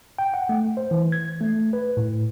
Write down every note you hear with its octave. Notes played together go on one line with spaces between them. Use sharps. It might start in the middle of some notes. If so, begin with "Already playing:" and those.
G5
F#5
A3
C5
E3
G#6
A3
B4
A2